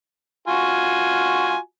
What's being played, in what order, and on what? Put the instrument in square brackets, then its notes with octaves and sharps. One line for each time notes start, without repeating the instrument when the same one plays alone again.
[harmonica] F4 F#4 G#5